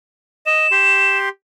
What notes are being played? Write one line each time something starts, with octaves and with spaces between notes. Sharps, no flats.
D#5 E7
G4 C6